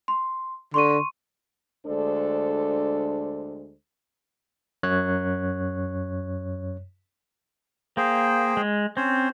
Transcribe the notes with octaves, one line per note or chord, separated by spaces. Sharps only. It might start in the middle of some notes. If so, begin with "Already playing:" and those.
C6
D3 C6 C#6 D#7
D2 G#3 D4 A4 C5 D5
F#2 C#5 F#6
A#3 G#4 C5 G5
G#3
C4 C#4 C5 C#5